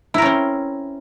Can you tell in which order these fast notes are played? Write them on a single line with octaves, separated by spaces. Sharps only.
E4 A#4 C#4 C4